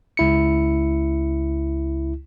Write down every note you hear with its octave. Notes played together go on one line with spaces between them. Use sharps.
C#2 E4 C#7